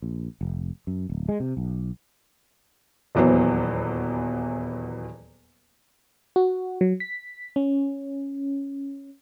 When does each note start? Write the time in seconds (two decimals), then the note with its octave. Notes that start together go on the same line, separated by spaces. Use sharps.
0.02 A#1
0.41 F1
0.87 F#2
1.09 D1
1.29 G#3
1.40 C3
1.57 B1
3.15 D#1 E2 E3 F#3 B3 C5
6.36 F#4
6.81 F#3
7.00 B6
7.56 C#4